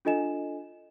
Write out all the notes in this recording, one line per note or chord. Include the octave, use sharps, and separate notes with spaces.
D4 F4 A4 D#5 G#5 E7